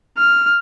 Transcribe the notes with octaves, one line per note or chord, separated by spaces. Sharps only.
F6